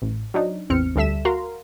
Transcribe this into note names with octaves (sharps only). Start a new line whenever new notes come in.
A1
F#3 D4 D#4
A1 E2 C4 F6 C#7
D2 G3 A4 E5 B6 E7
F#4 A#4 F5 A#5 C6